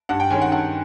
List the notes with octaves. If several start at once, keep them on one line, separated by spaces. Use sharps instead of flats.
G2 F#5
G5
D#3 G#3 C#4 G#5
F#5
G2 F#5